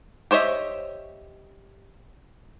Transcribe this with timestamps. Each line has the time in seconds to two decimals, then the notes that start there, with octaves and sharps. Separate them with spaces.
0.31 G4 C5 C#5 D#5 E5